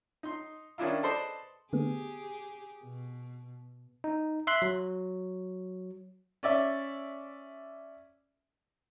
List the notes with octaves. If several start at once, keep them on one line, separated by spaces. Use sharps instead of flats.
D#4 D#5 C6
D#3 C#4 D4 E4 F4
A4 B4 C5 D5 D#5
D3 A3 B3 G4 G#4
B2
D#4
E5 C6 F#6
F#3
C#4 D5 E5